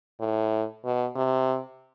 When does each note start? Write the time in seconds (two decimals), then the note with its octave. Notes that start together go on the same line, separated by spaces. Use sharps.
0.21 A2
0.85 B2
1.16 C3